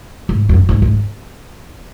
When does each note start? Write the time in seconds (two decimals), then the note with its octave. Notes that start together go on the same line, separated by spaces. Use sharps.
0.29 G#2
0.49 F#2
0.69 G#2
0.82 G#2